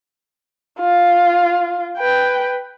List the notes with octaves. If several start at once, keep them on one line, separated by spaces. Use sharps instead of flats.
F4
B4 G5